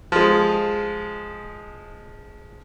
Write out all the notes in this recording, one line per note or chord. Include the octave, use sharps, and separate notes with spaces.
F3 G#3